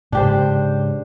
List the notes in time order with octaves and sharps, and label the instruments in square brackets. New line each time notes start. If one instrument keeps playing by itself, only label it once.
[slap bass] G#2 C#3 [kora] D4 G4 C5